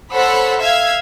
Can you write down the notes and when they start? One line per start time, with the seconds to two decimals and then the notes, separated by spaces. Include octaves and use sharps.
0.13 A4 C5 C#5 F#5 B5 E6
0.60 E5 F5 E6 G#6